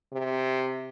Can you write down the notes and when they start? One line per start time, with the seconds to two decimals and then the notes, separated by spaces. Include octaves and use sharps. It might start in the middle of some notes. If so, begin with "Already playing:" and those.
0.12 C3